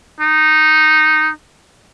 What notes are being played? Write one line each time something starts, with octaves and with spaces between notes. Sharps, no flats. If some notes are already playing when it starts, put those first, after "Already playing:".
D#4